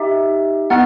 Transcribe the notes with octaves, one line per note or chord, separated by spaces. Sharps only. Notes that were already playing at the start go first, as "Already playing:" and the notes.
Already playing: D#4 G4 E5
B3 D#4 F#5